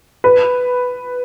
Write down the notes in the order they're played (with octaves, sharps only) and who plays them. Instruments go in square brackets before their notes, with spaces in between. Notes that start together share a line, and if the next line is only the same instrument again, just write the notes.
[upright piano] B4